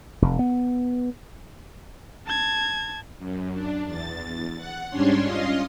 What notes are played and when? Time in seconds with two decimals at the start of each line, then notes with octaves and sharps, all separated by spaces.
0.22 F1
0.39 B3
2.26 A5 G#6
3.19 F#2
3.53 D4
3.86 E2 A6
4.57 F#5
4.90 G#2 G3 C#4 D4 C#5 C6
5.25 C#4 F4 D#5 F5 C6